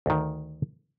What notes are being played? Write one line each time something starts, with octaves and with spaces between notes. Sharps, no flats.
D2 D#3